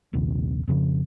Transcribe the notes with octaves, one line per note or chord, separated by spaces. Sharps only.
D#1 A#1 D#2 C3
F2 C#3 F3